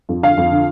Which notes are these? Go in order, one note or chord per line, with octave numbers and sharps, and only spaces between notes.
F2
D3 F5
F2
D3